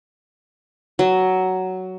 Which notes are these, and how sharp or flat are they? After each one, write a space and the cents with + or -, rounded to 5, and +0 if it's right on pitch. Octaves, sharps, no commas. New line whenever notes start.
F#3 +10